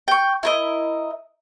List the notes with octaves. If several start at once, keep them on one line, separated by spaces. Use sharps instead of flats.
G5 C#6
E4 A#4 D#5